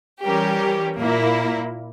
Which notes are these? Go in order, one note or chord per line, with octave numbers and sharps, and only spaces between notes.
E3 G3 C#4 G4 A#4
A#2 A#3 E4 A#4